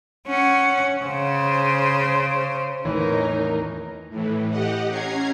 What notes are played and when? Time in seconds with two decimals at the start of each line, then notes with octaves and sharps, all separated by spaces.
0.28 C#4 F#5
1.04 C#3 C5
2.85 E2 A2 D#3 E3 D#4 A#4 C#5
4.10 A2 E3
4.50 G4 D#5 F#5
4.89 C#4 A#5 G#6 C7